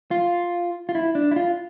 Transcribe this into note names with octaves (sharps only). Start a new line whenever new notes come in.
F4
F4
E4
D4
E4
F4